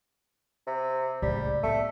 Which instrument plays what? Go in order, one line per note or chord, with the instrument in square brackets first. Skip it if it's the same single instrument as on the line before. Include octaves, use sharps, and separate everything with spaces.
[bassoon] C3
[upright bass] C#2 A2 [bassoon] G3
[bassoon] A3 [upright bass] B3